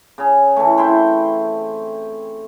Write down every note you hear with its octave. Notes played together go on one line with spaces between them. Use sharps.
C#3 G#4
E3 A3
C4 E4 G5 C6